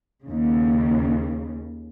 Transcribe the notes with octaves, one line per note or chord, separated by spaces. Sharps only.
D#2 C#3